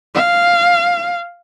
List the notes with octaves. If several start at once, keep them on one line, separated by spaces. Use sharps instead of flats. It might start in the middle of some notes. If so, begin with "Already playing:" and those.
F5